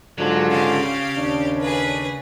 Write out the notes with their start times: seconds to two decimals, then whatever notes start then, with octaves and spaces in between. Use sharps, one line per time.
0.18 G#2 D3 F#3 F4
0.51 C#3 G4 F5
1.16 D#2 D4
1.60 G#4 B4